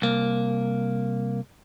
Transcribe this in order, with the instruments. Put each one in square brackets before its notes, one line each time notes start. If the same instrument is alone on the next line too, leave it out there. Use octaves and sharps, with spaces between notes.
[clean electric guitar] C2 A#3